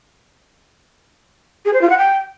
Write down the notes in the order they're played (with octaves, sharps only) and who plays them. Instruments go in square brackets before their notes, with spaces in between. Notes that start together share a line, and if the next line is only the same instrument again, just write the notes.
[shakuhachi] G#4
C5
F4
F#5
G5